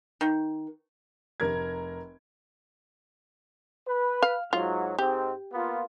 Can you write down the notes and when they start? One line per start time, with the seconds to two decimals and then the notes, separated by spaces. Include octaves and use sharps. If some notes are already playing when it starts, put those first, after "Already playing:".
0.21 D#3
1.40 F1 A#4 G#6
3.87 B4
4.23 F5
4.53 G#2 F#3 F4
4.98 G#2 C4 G4
5.52 A#3 B3 F4